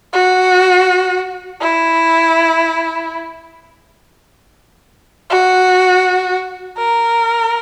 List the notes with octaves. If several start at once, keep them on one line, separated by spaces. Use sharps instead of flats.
F#4
E4
F#4
A#4